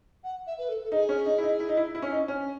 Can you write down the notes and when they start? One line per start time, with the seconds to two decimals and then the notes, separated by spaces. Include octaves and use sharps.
0.24 F#5
0.47 E5
0.58 B4
0.69 A4
0.83 A4
0.92 D#4 G#4
1.09 C#4
1.26 D#4
1.38 E4
1.43 D#4
1.60 E4
1.69 D#4
1.77 E4
1.95 E4
2.02 C#4
2.12 D#4
2.28 C#4